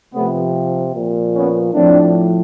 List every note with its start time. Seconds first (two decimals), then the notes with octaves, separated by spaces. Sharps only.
0.13 C3 F3 A3 B3
0.94 A#2 F3
1.34 B3 C#4
1.74 A2 F3 C4 D4